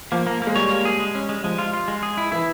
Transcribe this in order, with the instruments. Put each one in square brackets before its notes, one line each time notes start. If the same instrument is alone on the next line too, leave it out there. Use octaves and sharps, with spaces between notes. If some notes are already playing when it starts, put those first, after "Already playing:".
[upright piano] F3 [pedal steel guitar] A#3
[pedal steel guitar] A#3
A#3
[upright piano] G#3
[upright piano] G3 [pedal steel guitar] C#5
[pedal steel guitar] A#3
G#4
G#3
C#4
G#3
[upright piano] F3 [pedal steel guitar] G#3
[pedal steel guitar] F4
F4
G#3
G#4
E4
[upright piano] E3 [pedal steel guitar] E4